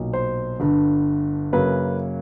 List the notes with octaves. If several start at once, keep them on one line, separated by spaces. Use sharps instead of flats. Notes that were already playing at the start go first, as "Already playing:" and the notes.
Already playing: B1 A#2 F#3
C5
G1 G2 D3
F#2 C#3 F#3 A#3 B4